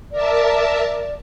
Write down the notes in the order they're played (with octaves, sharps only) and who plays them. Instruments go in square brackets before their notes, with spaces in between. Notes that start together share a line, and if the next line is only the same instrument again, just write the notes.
[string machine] A#4 E5 A5 [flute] D5